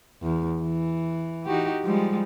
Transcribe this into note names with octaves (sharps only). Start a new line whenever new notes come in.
E2
E3
D#4 F#4 G4
F3 G3 G#3